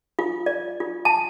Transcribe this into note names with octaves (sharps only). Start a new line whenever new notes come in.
F4
D5
F4
A5